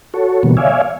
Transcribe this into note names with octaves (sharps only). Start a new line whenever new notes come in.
F#4 A4 C#5
B2 D3 E3 G3 A#3 B3
C#5 D5 E5 F5 G#5